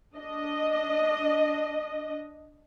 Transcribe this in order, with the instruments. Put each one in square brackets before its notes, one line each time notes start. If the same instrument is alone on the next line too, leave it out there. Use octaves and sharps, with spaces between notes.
[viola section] D4 D#5